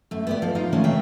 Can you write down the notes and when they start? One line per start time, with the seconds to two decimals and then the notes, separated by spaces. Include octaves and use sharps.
0.11 F#2 A3
0.27 B3 G4 D5
0.42 G#2 F3
0.55 D#4 F4 F5
0.72 C3 D#3 E3 G#3 A3 C#4
0.84 C#3 A#3 E5 G5